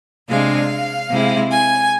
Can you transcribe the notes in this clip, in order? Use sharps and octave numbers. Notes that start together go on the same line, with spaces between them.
C3 G#3 D4 F5
C3 G#3 C4 E4
G#5